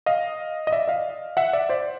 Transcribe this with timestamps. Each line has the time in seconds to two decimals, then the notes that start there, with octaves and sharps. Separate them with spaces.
0.06 D#5 F5
0.67 D#5
0.72 D5 E5
0.88 D#5 F5
1.37 E5 F#5
1.53 D5 E5
1.69 C5 D5